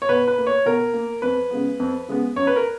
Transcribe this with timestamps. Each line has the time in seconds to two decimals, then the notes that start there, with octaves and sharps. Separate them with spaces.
0.02 C#5
0.09 B2 B4
0.28 B4
0.38 A#3
0.47 C#5
0.66 B2 A#4
0.94 A#3
1.22 F2 B4
1.51 C#3 G#3 B3
1.80 F2
2.08 C#3 G#3 B3
2.36 F#2 C#5
2.47 B4
2.56 A#4